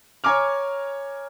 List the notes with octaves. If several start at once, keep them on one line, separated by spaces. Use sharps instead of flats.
C#5 G#5 A#5 D6 F6